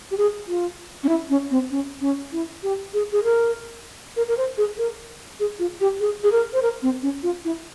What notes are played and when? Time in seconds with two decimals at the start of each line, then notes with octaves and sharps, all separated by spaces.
0.11 G4
0.17 G#4
0.48 F4
1.04 C#4
1.09 E4
1.30 C#4
1.51 C4
1.71 C#4
2.01 C#4
2.32 E4
2.63 G4
2.94 G#4
3.12 G#4
3.24 A#4
4.17 A#4
4.28 A#4
4.38 C5
4.58 G#4
4.78 A#4
5.40 G#4
5.59 F4
5.81 G4
6.00 G#4
6.24 G#4
6.32 A#4
6.54 C5
6.62 A#4
6.82 C4
7.03 C#4
7.23 F4
7.45 E4